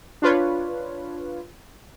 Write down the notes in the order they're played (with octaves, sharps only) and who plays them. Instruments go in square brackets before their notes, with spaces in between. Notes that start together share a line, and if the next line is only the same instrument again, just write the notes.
[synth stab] D4 F4 B4 C#5